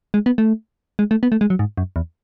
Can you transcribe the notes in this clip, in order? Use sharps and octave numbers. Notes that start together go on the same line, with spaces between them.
G#3
B3
A3
G#3
A3
B3
A3
G#3
F#3
G#2
F#2
E2